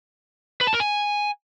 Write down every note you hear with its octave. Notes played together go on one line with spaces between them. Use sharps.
B4
A5
A#4
G#5